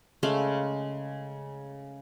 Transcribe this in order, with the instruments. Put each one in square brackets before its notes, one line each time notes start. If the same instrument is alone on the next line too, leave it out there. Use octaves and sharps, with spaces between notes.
[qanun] C#3 G#3 A3 F5